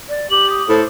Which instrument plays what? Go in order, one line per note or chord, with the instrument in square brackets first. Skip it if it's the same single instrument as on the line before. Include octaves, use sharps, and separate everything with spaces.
[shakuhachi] D5
[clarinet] G4 [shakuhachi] D6 [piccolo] F#7
[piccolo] D#6
[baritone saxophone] A2 [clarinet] A4 [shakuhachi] C5